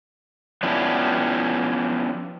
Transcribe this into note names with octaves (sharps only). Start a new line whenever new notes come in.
F3 B3 C#4 D4 E4 G4